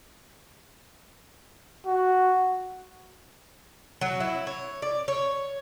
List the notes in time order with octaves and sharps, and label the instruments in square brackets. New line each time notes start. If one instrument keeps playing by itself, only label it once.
[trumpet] F#4
[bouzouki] F#3
E4
C#5
D5
C#5